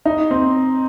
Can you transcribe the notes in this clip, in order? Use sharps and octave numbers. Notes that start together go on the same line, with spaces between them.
D#4
C4